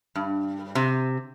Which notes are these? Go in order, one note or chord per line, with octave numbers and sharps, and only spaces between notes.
G2
C3